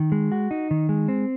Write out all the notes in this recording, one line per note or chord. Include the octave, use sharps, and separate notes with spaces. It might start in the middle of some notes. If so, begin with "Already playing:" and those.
Already playing: D#3
G#3
F#4
D#4
D#3
G#3
C4